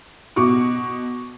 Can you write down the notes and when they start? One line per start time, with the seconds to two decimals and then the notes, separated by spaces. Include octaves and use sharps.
0.36 B2 F#4 C#6 D6